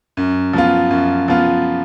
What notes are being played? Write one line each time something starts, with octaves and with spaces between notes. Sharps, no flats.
F#2
F3 B3 F4
F#2
F3 B3 F4